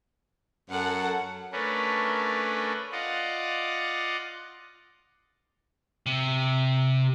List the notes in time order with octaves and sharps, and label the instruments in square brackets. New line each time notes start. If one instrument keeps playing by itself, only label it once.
[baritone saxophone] F#2 [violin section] A4 F#5
[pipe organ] A3 C#4 D4 A#4 B4
F4 D5 D#5 F#5
[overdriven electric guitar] C3